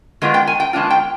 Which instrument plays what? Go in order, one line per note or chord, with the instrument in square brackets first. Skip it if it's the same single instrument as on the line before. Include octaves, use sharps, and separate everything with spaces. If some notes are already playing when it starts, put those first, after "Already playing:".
[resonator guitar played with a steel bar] D#3 G#3 B3 D4 F4
G5
G#5
G5
D#3 G#3 B3 D4 F4
G5